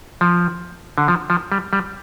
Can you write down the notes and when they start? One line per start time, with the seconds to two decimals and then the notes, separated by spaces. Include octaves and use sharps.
0.21 F3
0.98 D3
1.08 F3
1.30 F3
1.52 G3
1.73 G3